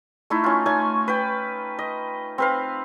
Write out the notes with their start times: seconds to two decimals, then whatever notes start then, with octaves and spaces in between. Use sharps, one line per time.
0.30 A3 D#4 E4
0.44 C#4 F4
0.66 A3 C#4 D#4 G#5
1.08 B4 G5
1.79 D#5
2.38 C4 B4 F5